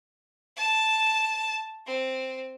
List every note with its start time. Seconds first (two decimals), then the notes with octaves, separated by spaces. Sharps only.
0.57 A5
1.86 C4